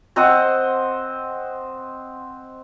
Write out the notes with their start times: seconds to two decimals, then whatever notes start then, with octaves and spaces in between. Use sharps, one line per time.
0.16 C4 C5 D#5 F#5